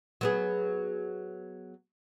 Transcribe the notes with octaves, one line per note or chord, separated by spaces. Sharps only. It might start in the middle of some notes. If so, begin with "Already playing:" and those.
F#3 B3 G#4